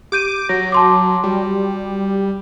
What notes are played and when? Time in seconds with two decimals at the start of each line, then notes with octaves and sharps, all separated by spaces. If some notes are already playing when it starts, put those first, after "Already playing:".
0.12 G4 D6 G6 D#7
0.49 F#3 A#6
0.72 A5 C6 D6
1.24 G3 F#4